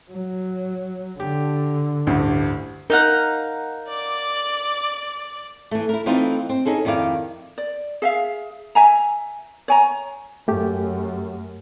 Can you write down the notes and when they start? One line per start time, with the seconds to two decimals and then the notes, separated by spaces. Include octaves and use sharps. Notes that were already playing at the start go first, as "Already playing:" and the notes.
0.12 F#3
1.20 D3 G4
2.07 A1 D2 G2
2.90 D#4 A#4 F5 F#5
3.89 D5 D6
5.71 E3 A3
5.89 E4 A#4
6.06 E3 A3 C4 D#4 F4
6.49 C4
6.66 C#4 D#4 G#4 A4
6.85 F2 D#3 E4 D5 F5
7.58 D5
8.02 G#4 E5 F5
8.75 E5 G#5 A#5
9.68 C#5 G#5 A#5
10.48 F#2 A3 G4